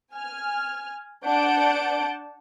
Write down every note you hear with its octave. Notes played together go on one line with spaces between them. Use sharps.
G#5 F6
D4 D5 F#5 A5 G6 D7